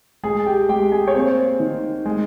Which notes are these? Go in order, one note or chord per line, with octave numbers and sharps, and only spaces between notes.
G#3 G#4 G#5
G4 G5
G#3 G4 G5
G#4 G#5
C#5
A#3 C4 C5
D#3
G#3